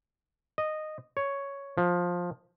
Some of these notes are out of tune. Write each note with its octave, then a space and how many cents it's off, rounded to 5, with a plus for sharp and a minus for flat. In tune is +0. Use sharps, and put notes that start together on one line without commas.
D#5 -10
C#5 +5
F3 +15